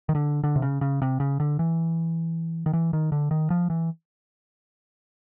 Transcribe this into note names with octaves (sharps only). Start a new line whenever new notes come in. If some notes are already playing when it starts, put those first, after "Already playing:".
D#3
D3
D3
C3
C#3
C#3
C3
C#3
D3
E3
D#3
E3
D#3
D3
D#3
F3
E3